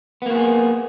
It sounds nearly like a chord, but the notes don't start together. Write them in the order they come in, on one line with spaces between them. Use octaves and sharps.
B3 A#3 F#4 G#4